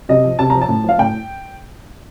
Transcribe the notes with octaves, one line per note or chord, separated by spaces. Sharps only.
C3 D#5
F3
C3 A5
F3 A#5
A5
A2
F3 F5
A2 G5